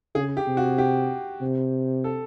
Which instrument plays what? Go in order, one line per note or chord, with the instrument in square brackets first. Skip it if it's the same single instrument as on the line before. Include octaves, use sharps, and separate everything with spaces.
[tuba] C#3 [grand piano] G#4
[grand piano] G4
[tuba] C3
[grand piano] F#4
G4
[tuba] C3
[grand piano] A4